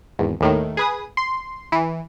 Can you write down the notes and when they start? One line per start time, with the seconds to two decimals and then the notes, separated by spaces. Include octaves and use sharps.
0.19 G#1 E2
0.40 D#2 A2 D#3
0.77 G#4 B4 D#6
1.17 C6
1.72 E3